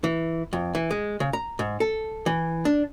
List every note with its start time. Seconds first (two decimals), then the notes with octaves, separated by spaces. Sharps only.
0.04 E3
0.53 F2
0.75 E3
0.91 G#3
1.20 C#3
1.33 A#5
1.59 G#2
1.80 A4
2.26 E3
2.65 D4